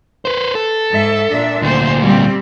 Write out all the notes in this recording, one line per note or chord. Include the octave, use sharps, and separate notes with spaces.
B4 C5
A4
G#2 E5
A#2 D4 E5
D2 A#2 C5
G3 C4